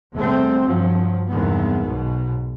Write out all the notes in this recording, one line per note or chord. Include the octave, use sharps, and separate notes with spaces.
E2 C3 G3 A3 C4
G2 F3 F#3
E2 G2 C3 D#3 G#3 B3
B1 G#2 B2